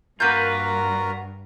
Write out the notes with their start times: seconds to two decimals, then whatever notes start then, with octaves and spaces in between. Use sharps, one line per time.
0.20 G2 A#3 F4 F#4 A#4 B4 A#5 G6